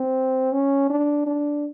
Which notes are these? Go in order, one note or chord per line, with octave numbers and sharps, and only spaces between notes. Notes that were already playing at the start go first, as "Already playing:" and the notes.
Already playing: C4
C#4
D4
D4